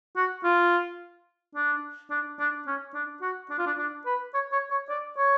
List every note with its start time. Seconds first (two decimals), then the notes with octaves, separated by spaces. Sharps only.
0.16 F#4
0.44 F4
1.55 D4
2.11 D4
2.39 D4
2.67 C#4
2.94 D4
3.22 F#4
3.50 D4
3.58 F4
3.67 D4
3.78 D4
4.06 B4
4.34 C#5
4.52 C#5
4.71 C#5
4.89 D5
5.18 C#5